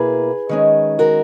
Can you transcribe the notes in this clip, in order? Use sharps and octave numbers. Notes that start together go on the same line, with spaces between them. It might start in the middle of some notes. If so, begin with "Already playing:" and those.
Already playing: B2 A#3 E4 G#4 B4
D#3 G#3 C#4
F#4 A#4